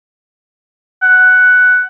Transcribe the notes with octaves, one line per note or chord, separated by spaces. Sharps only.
F#5